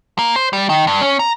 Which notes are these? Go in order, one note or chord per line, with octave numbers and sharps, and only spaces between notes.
A#3
C5
G3
D#3
G2
C#4
A#5